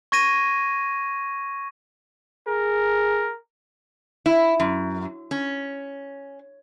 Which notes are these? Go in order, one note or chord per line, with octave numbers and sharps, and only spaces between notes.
C#6 G#6 A#6 D#7
G#4 A#4
E4
F#2
C#4